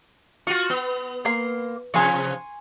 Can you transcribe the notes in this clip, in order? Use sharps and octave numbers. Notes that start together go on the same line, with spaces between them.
F4 F#4 C#6
B3
A#3 C6
C3 F3 G#5 C6 C#6